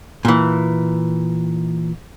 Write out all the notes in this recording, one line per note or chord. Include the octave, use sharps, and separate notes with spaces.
A#2 E3